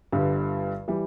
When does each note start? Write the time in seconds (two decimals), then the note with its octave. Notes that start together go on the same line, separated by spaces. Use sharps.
0.12 G1 G2 D3 G3
0.88 E3 G3